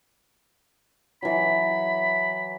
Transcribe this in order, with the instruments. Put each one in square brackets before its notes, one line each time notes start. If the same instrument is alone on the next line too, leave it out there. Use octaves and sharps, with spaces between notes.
[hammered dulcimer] E3 F#3 [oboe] B5